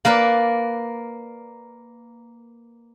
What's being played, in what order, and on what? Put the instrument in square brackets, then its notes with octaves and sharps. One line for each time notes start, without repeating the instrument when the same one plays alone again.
[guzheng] A#3 A#4 B4 D5